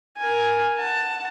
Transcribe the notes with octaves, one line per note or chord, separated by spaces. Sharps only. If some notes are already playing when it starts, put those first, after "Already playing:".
A#4 G#5
F#5 A5